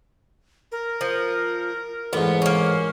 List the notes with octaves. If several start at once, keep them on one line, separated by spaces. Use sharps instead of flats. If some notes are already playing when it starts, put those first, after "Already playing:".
A#4
F3
A1 G#2 B3
A#3 C#4